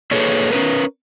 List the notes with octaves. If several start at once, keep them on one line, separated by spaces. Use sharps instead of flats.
A#3 G#4 A4 B4 C#5
C#4 A#4 B4